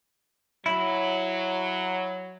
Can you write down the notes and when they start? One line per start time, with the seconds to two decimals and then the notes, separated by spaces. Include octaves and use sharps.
0.66 F#3 E4